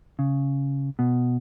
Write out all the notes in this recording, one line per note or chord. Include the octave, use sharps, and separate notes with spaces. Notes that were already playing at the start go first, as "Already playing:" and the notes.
C#3
B2